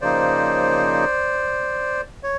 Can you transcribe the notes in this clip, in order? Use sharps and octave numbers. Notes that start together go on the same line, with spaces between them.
C#3 F3 A#3 D#4 C5 D5
C#5